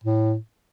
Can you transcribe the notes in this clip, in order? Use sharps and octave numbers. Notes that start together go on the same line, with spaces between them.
A2